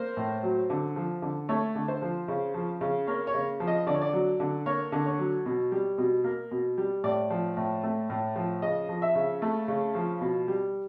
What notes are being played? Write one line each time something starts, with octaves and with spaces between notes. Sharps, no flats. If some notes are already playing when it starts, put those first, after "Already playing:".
Already playing: A#3 C5
A2
F#3
D3
F3
D3
A3 C#5
D3
C5
F3
C#3
F3
C#3
A#3 C#5
C#5
C#3
F3
D#5
D3 D5
C#5
D5
F#3
D3
A#3 C#5
D3
C#5
F#3
B2
G3
B2
A#3
B2
G3
A2 D5
F3
A2
A3
A2
F3
C#3 D#5
F3
E5
C#3
A3
C#3
F3
B2
G3